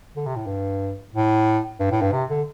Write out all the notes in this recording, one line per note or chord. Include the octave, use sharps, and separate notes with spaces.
D3
C3
A2
G2
A2
G2
A2
G2
C3
D3